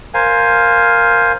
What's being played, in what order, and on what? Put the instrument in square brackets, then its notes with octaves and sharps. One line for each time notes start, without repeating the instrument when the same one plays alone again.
[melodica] A#4 C5 F5 G#5